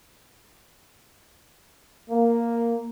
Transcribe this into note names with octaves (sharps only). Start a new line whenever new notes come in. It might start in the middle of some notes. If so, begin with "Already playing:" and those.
A#3